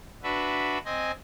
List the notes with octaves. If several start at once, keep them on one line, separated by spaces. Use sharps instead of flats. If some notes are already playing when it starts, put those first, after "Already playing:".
D4 F#4 B4 E5
C4 D#5 G#5